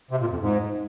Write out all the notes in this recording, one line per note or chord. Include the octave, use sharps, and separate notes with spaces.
C3
A#2
F2
G#2